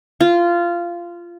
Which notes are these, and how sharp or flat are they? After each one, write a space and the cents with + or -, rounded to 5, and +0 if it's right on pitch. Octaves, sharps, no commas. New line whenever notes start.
F4 -15